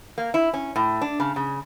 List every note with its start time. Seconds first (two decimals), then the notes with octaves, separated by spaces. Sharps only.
0.18 A#3
0.34 E4
0.54 C#4
0.76 A2
1.01 D4
1.20 C#3
1.36 C#3